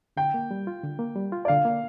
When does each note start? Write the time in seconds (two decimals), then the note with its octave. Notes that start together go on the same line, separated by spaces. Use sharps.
0.17 D3 G5
0.34 A#3
0.51 G3
0.67 F4
0.83 D3
0.99 A#3
1.16 G3
1.32 F4
1.45 D5
1.48 D3 F5
1.65 A#3